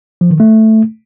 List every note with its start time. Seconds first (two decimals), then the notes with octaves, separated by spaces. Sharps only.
0.21 F3
0.30 D#3
0.40 A3